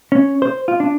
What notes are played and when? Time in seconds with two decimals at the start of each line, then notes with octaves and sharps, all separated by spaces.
0.12 C#4
0.42 C5
0.68 F4
0.80 D4